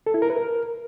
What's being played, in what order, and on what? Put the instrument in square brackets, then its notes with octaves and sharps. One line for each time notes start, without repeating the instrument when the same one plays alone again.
[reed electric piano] A4
E4
A#4
B4
A#4